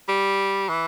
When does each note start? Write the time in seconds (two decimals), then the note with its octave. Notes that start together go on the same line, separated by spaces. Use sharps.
0.08 G3
0.69 E3